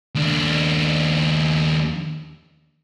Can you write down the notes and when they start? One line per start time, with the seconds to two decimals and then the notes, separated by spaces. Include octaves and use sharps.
0.15 D#2 D4